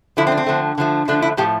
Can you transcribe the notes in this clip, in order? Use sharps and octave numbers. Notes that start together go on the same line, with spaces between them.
D3 F3 A3 E4
C4
D4
C4
D3 F3 A3
D3 F3 A3
D3 F3 A3 D4
E4
A2 F3 A3 G4